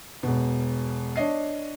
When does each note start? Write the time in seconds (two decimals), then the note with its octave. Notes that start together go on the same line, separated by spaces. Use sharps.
0.23 E1 B2
1.16 D4 C#5 D#5 C7